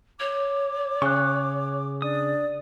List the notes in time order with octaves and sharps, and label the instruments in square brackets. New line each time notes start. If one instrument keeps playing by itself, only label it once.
[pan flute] C#5 [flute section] D6
[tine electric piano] C#3 G#4 [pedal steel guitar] C#6 F#6
[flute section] D4 D5 [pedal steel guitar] D#6